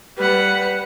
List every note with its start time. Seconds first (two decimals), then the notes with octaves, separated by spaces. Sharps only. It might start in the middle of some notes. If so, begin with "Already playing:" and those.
0.17 G3 B4 F#5